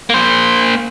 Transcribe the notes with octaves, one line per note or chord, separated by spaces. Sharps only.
A#3 C5